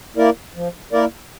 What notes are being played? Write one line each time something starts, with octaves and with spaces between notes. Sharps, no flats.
A#3 E4 A#4 D5
F3
A#3 E4 A#4 D5